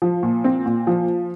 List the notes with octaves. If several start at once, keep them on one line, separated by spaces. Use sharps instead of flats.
F3
A#2
C4
A#2
F3